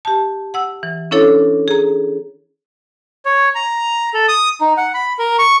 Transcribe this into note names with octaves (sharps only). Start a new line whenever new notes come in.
G4 A5
F#5 E6
E3
C#4 D4 E4 A4 C#5
G#4 A#5
C#5
A#5
A4
D#6
D#4
F#5
B5
A#4
C#6